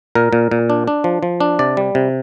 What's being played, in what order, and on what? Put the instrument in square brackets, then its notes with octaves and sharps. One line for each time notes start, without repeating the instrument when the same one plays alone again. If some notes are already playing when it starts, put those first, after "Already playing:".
[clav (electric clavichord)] A#2 A#4
A#2
A#2
D4
D4
F3
F3
D4
C3 D5
G3
C3